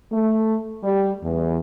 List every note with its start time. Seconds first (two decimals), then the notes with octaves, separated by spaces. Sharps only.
0.12 A3
0.84 G3
1.23 E2